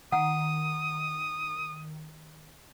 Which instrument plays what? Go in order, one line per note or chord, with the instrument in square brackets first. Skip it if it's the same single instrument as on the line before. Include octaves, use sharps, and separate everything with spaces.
[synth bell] D#3 [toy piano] F#5 [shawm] D#6